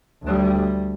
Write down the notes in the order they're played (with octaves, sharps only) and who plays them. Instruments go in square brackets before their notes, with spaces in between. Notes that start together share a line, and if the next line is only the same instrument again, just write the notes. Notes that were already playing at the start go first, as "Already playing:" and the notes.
[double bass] D2 G3